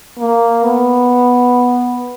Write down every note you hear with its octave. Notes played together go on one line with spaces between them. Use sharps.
A#3
B3